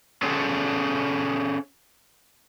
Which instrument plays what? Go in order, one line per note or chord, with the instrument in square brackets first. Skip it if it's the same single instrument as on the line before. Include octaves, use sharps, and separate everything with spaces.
[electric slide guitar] C#4 G#4 A4 C5